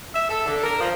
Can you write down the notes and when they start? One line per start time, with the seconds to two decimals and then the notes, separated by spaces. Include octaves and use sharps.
0.14 E5
0.29 A4
0.46 D3
0.63 A#4
0.80 F3